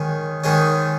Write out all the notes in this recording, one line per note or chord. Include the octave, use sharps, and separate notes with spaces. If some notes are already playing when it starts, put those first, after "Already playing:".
Already playing: D#3 G#3 C#4
G#2 D#3 G#3 C#4